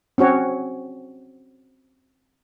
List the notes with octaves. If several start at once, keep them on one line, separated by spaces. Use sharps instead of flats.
C4 C#4 F#4 C#5